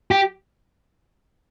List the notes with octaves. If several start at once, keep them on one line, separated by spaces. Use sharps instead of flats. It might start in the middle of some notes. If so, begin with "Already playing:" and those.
G4